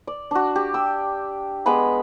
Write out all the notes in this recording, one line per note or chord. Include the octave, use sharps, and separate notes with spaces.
D5
D4 F#4
G4
G5 E6
G#3 B3 B4 B5